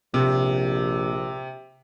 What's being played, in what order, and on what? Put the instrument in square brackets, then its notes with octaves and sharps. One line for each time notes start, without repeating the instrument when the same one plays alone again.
[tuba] A#1 [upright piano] C3